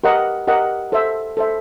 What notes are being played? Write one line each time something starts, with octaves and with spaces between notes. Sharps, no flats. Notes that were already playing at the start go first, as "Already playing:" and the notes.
G4 A#4 D#5 F#5
G4 A#4 D#5 F#5
A4 C5 E5
A4 C5 E5